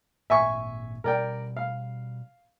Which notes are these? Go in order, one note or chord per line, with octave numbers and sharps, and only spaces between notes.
G#1 A#2 E5 G#5 C#6
B2 G3 A#4 D5 G5
F5